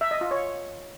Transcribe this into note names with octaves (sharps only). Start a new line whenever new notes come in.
E5
D#5
F4
C#5